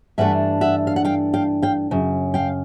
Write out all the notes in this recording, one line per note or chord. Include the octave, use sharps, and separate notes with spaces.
G2 E3 A3 D4 E5 F#5
E5 F#5
F5
F#5
F5 G5
F5 G5
F5 G5
F#2 C#3
F5 G5